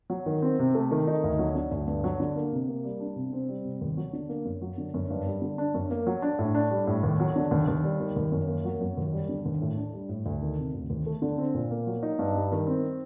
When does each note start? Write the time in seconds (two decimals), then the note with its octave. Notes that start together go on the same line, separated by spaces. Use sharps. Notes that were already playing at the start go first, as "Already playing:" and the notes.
0.10 F#3
0.26 D#3
0.42 C4
0.59 C3
0.74 A3
0.91 D#3
1.07 D#4
1.24 D2
1.39 F#3
1.55 D3
1.72 D2
1.87 G2
2.04 F#3
2.20 D3
2.36 A#3
2.52 C3
2.68 A#3
2.84 G3
3.00 D4
3.16 C3
3.33 C4
3.49 G3
3.65 C3
3.81 D#2
3.97 F#3
4.13 D3
4.29 A#3
4.45 F#2
4.62 F#3
4.78 D3
4.94 F#2
5.10 G2
5.26 G3
5.42 D3
5.58 D4
5.74 F#2
5.91 A#3
6.07 F#3
6.22 D4
6.39 A2
6.55 D4
6.71 G3
6.87 A2
7.03 D#2
7.20 F#3
7.36 D3
7.51 D#2
7.68 D#2
7.84 G3
8.00 D#3
8.16 D#2
8.32 F#2
8.48 A#3
8.65 F#3
8.81 F#2
8.97 D#2
9.12 G3
9.29 D3
9.45 D#2
9.62 A2
9.77 D4
9.94 G3
10.09 A2
10.26 D2
10.42 D#3
10.58 C3
10.74 D2
10.90 D#2
11.06 A3
11.22 D3
11.38 C4
11.54 A#2
11.71 A#3
11.87 F#3
12.03 D#4
12.19 G2
12.35 G3
12.52 D#3
12.67 C4